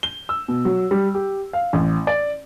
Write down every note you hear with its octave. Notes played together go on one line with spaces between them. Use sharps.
G7
E6
B2
F#3
G3
G4
F5
A1
D5